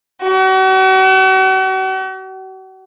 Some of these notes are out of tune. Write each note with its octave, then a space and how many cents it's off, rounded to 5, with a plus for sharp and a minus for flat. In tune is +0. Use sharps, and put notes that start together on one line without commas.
F#4 +40